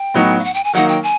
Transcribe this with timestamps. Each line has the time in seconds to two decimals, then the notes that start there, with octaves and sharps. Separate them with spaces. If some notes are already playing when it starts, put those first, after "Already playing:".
Already playing: G5
0.14 A2 F#3 B3 D#4
0.39 F5
0.44 F#5
0.54 G5
0.64 G#5
0.73 D#3 F#3 A#3 D#4 F#5
0.88 G5
1.03 G#5